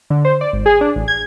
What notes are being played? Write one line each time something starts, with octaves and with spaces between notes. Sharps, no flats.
D3
C5
D5
G#1
G#4
D4
A1
G#6